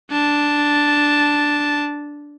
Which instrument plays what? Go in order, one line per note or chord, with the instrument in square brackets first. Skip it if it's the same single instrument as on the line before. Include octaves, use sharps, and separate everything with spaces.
[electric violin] D4 A5